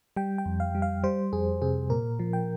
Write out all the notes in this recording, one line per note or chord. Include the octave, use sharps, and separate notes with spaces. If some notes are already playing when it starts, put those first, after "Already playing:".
G3 G5
G5
F2
F5
G3
F5
G3 C5
F2 G#4
C3 G#4
A#2 A#4
F3
G5